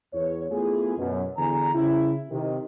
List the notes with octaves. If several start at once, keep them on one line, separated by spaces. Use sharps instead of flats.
E2 C#5
A3 B3 E4 F4 G#4
F#2 B2
E2 D3 E3 G#5 A#5
C#3 E4
C3 D#3